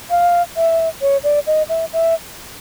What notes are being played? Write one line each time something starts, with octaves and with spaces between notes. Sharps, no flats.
F5
E5
C#5
D5
D#5
E5
E5